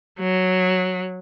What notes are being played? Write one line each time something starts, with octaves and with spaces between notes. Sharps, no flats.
F#3